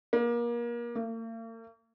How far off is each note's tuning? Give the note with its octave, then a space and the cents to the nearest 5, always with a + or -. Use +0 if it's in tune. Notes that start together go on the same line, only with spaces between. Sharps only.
A#3 +30
A#3 -45